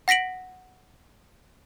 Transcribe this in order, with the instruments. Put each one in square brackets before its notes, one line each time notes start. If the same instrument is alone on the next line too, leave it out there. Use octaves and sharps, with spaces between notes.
[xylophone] F#5 A#6 B6 D7 F#7